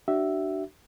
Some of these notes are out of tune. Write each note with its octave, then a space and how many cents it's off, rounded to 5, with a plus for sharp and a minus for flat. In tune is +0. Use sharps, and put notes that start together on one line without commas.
D4 +15 F#4 +40 E5 +0